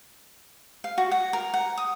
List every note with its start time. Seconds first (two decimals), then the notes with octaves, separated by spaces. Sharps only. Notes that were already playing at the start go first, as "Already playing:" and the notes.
0.84 F5
0.98 F#4
1.11 F#5
1.33 A#4
1.54 F#5
1.77 D#6